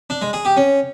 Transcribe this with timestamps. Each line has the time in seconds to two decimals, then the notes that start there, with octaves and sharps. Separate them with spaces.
0.10 D4
0.22 G#3
0.33 G#4
0.45 G4
0.57 C#4